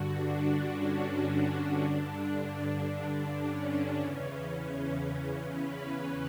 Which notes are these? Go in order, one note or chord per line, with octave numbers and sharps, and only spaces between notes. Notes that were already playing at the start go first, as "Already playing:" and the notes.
Already playing: G2 D3 F#4
D4
C#4
C#4
G2 D3 D4
C#4
E2 C#3 E3
C#4
B4